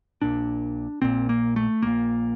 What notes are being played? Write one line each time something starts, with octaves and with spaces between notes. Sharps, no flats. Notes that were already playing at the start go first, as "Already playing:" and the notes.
A#1 A#2 D4
A#1 A#2 C4
A#3
A3
A#1 A#2 A#3